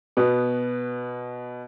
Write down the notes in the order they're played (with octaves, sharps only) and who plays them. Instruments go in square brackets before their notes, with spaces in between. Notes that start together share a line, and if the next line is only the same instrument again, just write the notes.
[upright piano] B2 B3